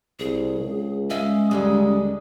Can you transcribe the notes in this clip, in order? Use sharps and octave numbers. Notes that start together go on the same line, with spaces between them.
C2 G#4
C#2
G#3 C#4 E5 F5
D#2 D3 G3 G#3